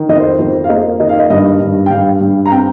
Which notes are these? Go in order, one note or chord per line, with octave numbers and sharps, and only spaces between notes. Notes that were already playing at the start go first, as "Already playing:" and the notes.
Already playing: D#3
F2 D#5
C5
F2 C5
F5
A#3 D#5
D#3 D#5
F5
D#5
G2 D#5
G2
G5
G2 F5
G2
A#5
C4 G5